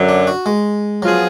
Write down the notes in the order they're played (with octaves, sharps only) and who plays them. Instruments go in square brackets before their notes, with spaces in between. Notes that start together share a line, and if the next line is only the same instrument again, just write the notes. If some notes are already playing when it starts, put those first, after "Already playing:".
Already playing: [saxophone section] F#2 D3 F#3
[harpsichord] D4
F#4
G#3
[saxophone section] F3 B3 F4 G#4 [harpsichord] F#3